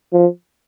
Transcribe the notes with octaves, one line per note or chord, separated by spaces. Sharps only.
F3